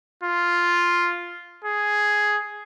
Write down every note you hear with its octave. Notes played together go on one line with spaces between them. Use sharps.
F4
G#4